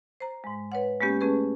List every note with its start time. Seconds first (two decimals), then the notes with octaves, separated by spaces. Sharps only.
0.20 C5 A#5
0.44 G#2 G#3
0.72 B4 C#5 F#5
1.01 G#3 A#3 B3 C#4 G4
1.21 A3 C#4 G#4 B4